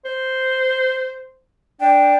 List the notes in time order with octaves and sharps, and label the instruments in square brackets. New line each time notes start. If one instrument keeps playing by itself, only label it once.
[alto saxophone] C5
[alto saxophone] D4 [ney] G5